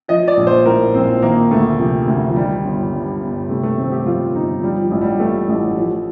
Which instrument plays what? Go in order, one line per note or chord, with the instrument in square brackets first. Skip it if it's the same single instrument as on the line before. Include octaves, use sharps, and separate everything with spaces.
[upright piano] F3 D#5
D5
A#1
C5
A2 A#4
A#1 C4
D#3 A#3
D2 A3
C3 F3
D2
F3
D#3 G3
G1
G2
G1
C3 A3
A3
D#3 C4
G4
F2 F4
G1 D#4
F3 G3
F3
A1
G3
A2 A3
A1
F3